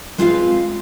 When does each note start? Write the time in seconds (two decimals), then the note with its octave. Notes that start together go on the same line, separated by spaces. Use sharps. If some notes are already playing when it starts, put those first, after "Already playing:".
0.18 G#3 C4 F4 G#4 B4 F5